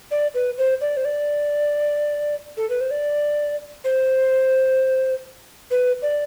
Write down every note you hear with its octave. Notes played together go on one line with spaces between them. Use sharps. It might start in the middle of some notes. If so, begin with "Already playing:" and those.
D5
B4
C5
D5
C5
D5
A4
B4
C5
D5
C5
B4
D5